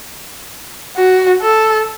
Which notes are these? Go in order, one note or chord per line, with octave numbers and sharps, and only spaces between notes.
F#4
A4